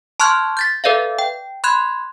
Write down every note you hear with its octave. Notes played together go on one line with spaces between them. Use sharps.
A5 C6 C#6 F6 F#6 G#6
G6 A6 B6
A4 B4 D5 E5 F5
G5
B5 C6 F#6 G#6